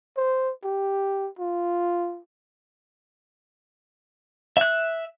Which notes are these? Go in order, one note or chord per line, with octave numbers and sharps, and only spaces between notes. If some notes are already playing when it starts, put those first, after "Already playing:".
C5
G4
F4
E5 F#6